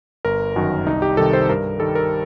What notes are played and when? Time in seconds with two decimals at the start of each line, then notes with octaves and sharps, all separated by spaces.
0.25 G1 A#4
0.56 F#2 D#3 F#4
0.86 C2 D#4
1.02 G4
1.17 C3 D#3 G3 A4
1.33 C5
1.49 G2 A#4
1.80 D#3 G3 A4
1.95 A#4